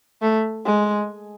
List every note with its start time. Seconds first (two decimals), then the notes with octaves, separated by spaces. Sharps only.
0.22 A3
0.65 G#3